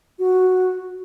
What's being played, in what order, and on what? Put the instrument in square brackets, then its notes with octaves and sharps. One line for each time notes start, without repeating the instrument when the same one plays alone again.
[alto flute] F#4